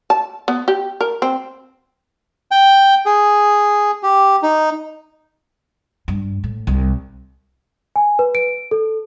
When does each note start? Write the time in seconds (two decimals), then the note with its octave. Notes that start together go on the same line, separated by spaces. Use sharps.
0.10 A5
0.48 B3
0.68 G4
1.01 A#4
1.22 C4
2.51 G5
3.06 G#4
4.03 G4
4.43 D#4
6.08 G2
6.44 A2
6.67 C2
7.96 G#5
8.19 B4
8.35 D7
8.71 A4